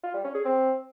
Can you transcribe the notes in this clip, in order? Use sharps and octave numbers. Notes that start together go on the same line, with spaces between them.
F4
G3
C#4
G#4
C4